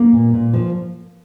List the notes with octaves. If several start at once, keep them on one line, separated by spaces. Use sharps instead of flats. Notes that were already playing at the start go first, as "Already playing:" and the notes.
Already playing: A#3
A#2
A#2
F3